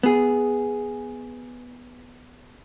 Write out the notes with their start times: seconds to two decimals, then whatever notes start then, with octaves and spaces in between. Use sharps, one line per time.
0.03 B3 G#4